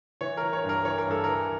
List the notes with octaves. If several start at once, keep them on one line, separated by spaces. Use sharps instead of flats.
E3 C#5
E3 A#4
C#5
G2
A#4
E3 C#5
A#4
G2 A4
E3 A#4